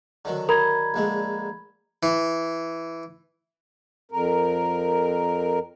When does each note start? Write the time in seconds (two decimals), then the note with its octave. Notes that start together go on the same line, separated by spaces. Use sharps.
0.25 D3 D#3 F#3
0.49 A#4 A#5 B5 G#6
0.94 A#1 D3 G#3
2.03 E3
4.11 F2 A#4